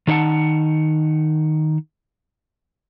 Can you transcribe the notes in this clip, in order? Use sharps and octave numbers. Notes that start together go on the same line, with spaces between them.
D#3 D#4 C5 F#5 A5